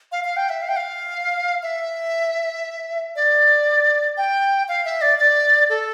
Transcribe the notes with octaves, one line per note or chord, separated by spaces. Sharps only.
F5
F5
G5
E5
F5
G5
F5
E5
D5
G5
F5
E5
D5
D5
A4